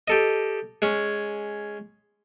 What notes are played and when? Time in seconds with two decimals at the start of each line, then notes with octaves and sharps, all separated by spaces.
0.08 G4 A4 D#5
0.82 G#3 C#4